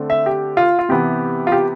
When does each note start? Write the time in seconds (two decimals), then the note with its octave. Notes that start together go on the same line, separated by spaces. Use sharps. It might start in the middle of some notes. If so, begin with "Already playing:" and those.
Already playing: D3 A3 C4
0.10 E5
0.26 G4
0.57 F4
0.79 F4
0.89 C3 E3 B3 G4
1.47 F4
1.52 G4